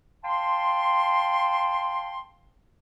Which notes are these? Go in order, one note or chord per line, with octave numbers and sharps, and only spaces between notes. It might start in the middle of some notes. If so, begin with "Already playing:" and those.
F5 G5 A5 C6